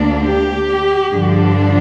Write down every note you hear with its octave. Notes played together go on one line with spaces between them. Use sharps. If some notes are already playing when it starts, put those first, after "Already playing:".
Already playing: D2 D3 A#3 D4
G4
G2 D3 F3 D4